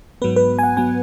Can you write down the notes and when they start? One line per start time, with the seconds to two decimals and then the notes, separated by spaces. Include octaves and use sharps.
0.22 G#2 F#3 B3 B4
0.36 B4
0.59 G#5
0.63 F#5
0.77 F#3 B3 G#5